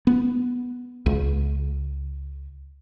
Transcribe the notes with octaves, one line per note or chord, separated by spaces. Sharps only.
B3
C#2